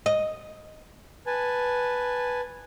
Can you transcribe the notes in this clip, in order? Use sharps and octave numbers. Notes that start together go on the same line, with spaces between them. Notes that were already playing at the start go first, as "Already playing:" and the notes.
D#5
B4 G#5 A5